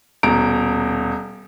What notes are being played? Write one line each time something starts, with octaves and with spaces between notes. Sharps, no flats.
D#1 B2 A#5 D7